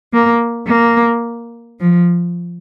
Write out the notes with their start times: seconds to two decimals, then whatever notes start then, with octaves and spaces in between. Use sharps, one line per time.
0.13 A#3
0.68 A#3
1.80 F3